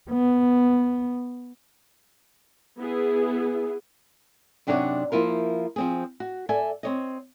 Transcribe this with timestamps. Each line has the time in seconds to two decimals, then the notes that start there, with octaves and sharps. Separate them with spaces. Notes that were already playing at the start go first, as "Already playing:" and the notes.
0.11 B3
2.78 B3 E4 G#4
4.67 F#2 C3 D4 D#4 C#5 F#5
5.12 F3 A#3 E4 F4 A#4
5.76 F3 C4 G#4
6.20 F#4
6.49 A4 D5 E5 G#5
6.83 C4 C#5 D#5